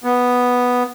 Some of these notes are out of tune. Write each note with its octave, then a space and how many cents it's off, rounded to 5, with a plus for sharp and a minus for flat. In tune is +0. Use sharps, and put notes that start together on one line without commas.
B3 +0